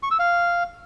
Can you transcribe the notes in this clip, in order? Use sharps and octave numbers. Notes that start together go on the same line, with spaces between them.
C#6
E6
F5